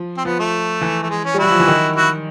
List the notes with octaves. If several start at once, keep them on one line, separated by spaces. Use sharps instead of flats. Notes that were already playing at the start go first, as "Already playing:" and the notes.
Already playing: F3
C4
F3 B3
A3
E3
A3
G#3
C#4
G3
F#3 E4 F#4
F3
E3
D#3
E4 F#4